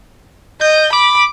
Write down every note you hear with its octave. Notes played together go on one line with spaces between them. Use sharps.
D#5 G6
B5 D6